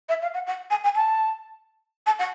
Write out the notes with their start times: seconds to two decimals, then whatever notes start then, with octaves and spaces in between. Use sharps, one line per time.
0.09 E5
0.22 F5
0.34 F#5
0.47 F#5
0.70 G#5
0.84 G#5
0.95 A5
2.06 A5
2.19 F#5